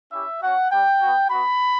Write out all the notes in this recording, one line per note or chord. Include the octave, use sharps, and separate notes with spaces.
C#4 E4 G4 E5
C#4 F#4 F#5
G3 D4 G4 G5
B3 F#4
B3 F#4 B5